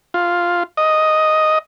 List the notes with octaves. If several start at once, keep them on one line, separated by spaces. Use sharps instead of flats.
F4
D#5